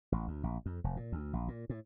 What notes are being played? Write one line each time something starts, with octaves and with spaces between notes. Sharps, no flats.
A1
D2
A#1
F2
F1
A#2
D2
A#1
A#2
A2